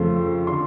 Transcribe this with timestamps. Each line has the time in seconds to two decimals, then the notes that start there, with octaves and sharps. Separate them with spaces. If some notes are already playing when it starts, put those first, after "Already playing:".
Already playing: F2 C#3 F3 A3 C6
0.47 D3 C6